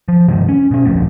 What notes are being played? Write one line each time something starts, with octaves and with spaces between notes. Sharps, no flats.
F3
G2 C3 D#3 G#3
C#4
B2 C#4
D1 A#1 F2 A3